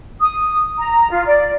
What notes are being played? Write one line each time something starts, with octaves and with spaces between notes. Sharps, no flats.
D#6
A#5
F4
D5